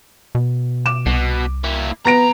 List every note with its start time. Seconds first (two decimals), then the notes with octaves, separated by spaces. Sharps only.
0.35 B2
0.86 D6 E7
1.06 C2 B2
1.64 A#3 E4
2.06 F2 B3 A#5 A#6 D7